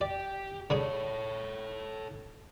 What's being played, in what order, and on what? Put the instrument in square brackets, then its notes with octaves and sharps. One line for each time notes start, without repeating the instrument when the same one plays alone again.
[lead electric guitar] G4 [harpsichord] D5
[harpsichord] D3 G3 G#4 [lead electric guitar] A4 C#5